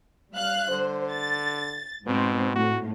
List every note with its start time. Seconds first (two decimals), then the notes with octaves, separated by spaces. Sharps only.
0.32 G3 F5 F#6
0.71 D3 C5
1.10 A6
2.07 G#2 B2 C4
2.55 A2 F#4